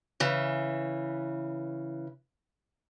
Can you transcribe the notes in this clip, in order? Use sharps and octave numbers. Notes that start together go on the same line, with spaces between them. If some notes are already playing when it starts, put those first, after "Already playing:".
C#3 E3